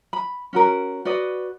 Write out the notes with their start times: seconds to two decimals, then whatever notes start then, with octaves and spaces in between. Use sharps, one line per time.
0.13 B5
0.53 C#4 F#4 A#4
1.05 F#4 B4 D5 D#5